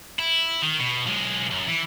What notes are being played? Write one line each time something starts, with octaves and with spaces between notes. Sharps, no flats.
E4
D#3
B2
B1 G#3
F#2
E3